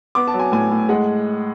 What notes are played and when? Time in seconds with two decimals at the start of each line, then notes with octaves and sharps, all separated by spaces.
0.15 B3 D6
0.28 A5
0.34 F#3
0.39 G#5
0.52 A2 G#5
0.70 A2
0.89 G#3 F#5